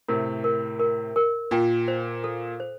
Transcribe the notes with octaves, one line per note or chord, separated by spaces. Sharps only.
A2 C3 A#4
A#4
A#4
A#4
A#2 G5
C5
A4
C5